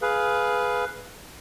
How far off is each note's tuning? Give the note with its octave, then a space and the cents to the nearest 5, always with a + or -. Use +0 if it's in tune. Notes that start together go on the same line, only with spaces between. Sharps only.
G#4 +15 B4 +0 F5 +0